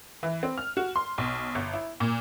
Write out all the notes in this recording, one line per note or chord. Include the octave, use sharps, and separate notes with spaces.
E3
C4
F6
F#4
C6
B1
G1
E4
A#2